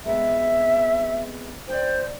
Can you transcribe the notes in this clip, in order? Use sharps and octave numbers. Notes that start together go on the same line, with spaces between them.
C3 G#3 B3 E5
C5 D5 G5